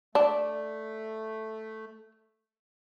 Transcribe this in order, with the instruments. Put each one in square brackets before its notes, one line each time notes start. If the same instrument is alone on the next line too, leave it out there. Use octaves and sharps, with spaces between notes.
[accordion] A3 [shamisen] D4